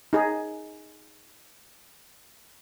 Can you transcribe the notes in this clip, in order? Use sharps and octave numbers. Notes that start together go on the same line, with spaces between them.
D#4 G#4